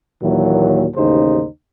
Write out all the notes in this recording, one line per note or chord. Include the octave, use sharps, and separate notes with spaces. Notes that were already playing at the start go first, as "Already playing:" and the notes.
D#2 A#2 E3 F#3
A1 D#2 C#3 D#4 C5